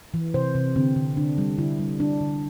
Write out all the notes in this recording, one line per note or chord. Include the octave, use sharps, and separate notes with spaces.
E3
C3 C5
C3
D3 C4
D3
D3 D4
G3
D3 E4
G3
D3 D4
D3